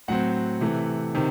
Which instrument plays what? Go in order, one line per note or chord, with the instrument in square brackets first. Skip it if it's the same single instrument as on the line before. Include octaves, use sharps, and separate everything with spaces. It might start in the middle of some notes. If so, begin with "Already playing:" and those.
[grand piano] A2 F#3 C4 F#5
C3 E3 A3
C3 D#3